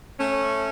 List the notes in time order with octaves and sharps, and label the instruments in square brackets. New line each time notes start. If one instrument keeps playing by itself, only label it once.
[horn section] A3 C#4